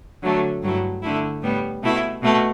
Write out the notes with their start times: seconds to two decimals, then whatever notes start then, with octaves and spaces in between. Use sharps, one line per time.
0.22 D3 F#3 A3
0.62 G2 F#3 A3 E4
1.02 D3 A3 E4
1.42 A2 G3 B3
1.83 B2 A3 E4
2.22 B2 A3